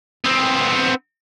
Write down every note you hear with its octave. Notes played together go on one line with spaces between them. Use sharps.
B3 C4